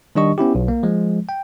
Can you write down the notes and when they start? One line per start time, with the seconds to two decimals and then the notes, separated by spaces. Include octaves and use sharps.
0.15 D#3 G3 D4 G4 D#5 C#6
0.38 B3 C#4 E4 G4
0.55 B1
0.68 A#3
0.83 F3 G#3
1.29 G5